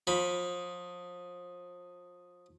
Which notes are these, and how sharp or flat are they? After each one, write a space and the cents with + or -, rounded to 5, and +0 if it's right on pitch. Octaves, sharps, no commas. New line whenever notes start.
F3 +30 B5 +0